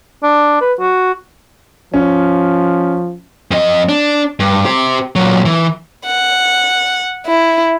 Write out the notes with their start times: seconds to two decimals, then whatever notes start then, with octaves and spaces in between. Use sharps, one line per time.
0.23 D4
0.61 B4
0.79 F#4
1.94 F3 C#4
3.51 F2 D#5
3.89 D4
4.40 G2
4.65 G4 C5
5.16 A#2 F#3
5.45 E3
6.06 F#5
7.26 E4